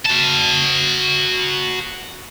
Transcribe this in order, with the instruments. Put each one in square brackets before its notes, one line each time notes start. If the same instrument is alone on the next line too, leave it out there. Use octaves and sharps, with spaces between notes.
[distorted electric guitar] F#4 A5